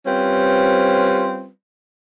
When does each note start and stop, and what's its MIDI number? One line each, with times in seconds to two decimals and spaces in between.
0.06 1.48 55
0.06 1.48 60
0.06 1.48 61
0.06 1.48 65
0.06 1.48 71
0.06 1.48 72